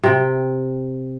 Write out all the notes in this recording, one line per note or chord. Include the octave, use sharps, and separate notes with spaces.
C3 G5